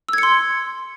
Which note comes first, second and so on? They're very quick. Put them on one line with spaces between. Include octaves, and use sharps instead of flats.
E6 G#6 C#7 C6